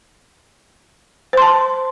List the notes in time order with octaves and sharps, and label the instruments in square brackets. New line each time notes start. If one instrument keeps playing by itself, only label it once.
[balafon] C5
C6
A5